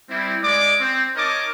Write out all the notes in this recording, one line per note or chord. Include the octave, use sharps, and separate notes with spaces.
G3 C4 E4
G#3 D5 D6
C4
D#4 A#4 C#5 D#5 A5 D6